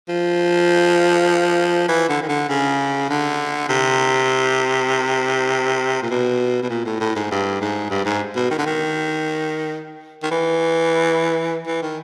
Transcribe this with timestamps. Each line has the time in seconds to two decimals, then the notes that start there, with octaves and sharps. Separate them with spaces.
0.09 F3
1.89 E3
2.09 D3
2.23 D#3
2.29 D3
2.49 C#3
3.09 D3
3.69 C3
6.03 A#2
6.10 B2
6.63 B2
6.70 A#2
6.85 A2
7.00 A2
7.16 G#2
7.31 G2
7.61 G#2
7.91 G2
8.05 G#2
8.36 B2
8.51 D#3
8.58 D3
8.66 D#3
10.23 D#3
10.31 E3
11.67 E3
11.82 D#3